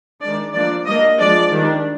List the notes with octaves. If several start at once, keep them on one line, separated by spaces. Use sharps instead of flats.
D#3 G#3 D4 D5
F3 A#3 D4 D5
G3 A#3 D4 D#5
F3 G#3 D4 D5
D#3 G3 D4